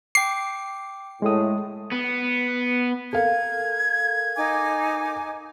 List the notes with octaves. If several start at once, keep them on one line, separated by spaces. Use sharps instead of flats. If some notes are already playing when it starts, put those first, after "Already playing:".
G5 D6 C7
A2 G#3 D#6
B3
A4 A#4 F5 G#6
D#4 G#5 D6